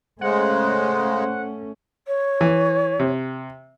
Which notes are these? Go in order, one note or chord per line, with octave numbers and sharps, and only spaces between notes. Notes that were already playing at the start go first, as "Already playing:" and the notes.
C#3 G#3 A3 C#4 C5 F#5
C#5
E3
C3